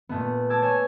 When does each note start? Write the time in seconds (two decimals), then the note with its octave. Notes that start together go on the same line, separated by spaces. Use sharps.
0.09 A#2 A3 B3
0.50 A5 D6 E6 G#6
0.62 C#5 G#5 G#6